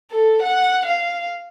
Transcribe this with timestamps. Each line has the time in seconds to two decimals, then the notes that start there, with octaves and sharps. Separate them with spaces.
0.11 A4
0.42 F#5
0.85 F5